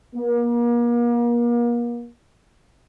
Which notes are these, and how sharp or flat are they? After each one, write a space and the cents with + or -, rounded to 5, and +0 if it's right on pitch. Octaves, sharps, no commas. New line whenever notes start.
A#3 +35